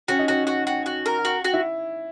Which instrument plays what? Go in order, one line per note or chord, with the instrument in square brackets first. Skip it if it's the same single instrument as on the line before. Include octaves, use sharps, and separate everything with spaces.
[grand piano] C#4 [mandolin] F#4
[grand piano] D#4
[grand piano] C#4 [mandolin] F#4
[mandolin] F#4
F#4
F#4
A#4
F#4
F#4
[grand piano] E4